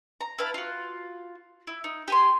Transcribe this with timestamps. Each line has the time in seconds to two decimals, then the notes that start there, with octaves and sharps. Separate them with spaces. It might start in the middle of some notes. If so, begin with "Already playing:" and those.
0.21 A#5
0.38 E4 B4 F5 A5
0.54 F4 F#4
1.67 E4
1.84 D#4
2.08 G4 G#5 C6